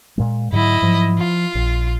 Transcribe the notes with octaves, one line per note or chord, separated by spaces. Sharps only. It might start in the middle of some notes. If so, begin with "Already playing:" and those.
A#2 G#3
G#2 D3 F#3 E4 D#5
G#2 F3 F#3
F3 F4
A#1